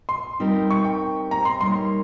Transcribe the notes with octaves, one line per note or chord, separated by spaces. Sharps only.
C6
G3 C4 D#4 G4 A#4
C#6
G5
A#5
C6
G3 A#3 D#4 A#4 C#5 C6